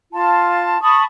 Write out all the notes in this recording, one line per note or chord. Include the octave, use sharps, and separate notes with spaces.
F4 A5
A5 B5 C#6 D#6